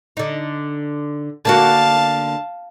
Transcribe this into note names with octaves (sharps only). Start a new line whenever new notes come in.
D3 D#4
D3 A#3 F#4 F5 A5